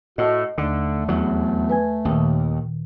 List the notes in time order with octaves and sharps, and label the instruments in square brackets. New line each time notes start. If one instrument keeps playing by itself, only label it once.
[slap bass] A2 [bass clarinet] F#4 [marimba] D#5 A5
[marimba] D#2 [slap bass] D3 [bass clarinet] A3
[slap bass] E2 F#3
[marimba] B4 G#5 G#6
[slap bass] D#2 [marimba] A#2 D#3